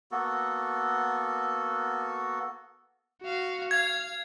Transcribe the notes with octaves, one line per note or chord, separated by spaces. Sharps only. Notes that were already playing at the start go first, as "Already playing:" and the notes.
A#3 B3 F#4 A4
F#4 F5
F5 G#6